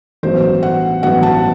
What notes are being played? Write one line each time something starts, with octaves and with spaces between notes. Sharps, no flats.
A1 G2 F#3 B3 C5
F#5
A1 G2 F#3 B3 F#5
A5